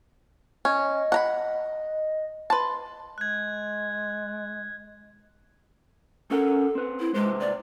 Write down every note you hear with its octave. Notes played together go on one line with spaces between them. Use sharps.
C#4 D#5
F#5 A#5 B5
B4 A5 C6
G#3 F#6 G#6
C#4 A4 A#4 F#5
C4 B4
E4
C3 G#3 B4 C5
D5